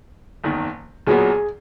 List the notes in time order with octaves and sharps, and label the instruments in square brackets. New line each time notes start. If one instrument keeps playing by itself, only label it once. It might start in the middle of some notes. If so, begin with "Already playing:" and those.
[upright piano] F#1 E2 D#3
[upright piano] B1 A#2 F#3 B3 [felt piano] G#4